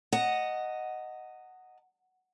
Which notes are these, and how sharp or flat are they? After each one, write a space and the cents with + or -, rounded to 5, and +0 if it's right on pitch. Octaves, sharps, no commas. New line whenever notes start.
D#5 +0 F#5 +0 A5 +45